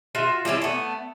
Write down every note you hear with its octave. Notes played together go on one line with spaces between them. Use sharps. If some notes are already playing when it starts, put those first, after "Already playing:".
F4 F#4 E5
G3 C4 C#4 E4
A3 B3